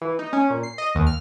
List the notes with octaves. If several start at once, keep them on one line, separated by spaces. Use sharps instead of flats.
E3
D#4
C#4
A#2
C7
D#5
D#2
F6